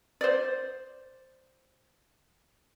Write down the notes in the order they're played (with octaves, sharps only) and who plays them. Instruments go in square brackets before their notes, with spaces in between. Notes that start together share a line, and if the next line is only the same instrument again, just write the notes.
[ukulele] C5 D5